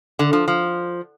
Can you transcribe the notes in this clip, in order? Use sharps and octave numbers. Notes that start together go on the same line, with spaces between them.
D3
F3
F3